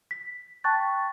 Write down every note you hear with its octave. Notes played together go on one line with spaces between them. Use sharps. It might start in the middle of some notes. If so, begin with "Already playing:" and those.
B6
G5 A5 C#6 F#6 A6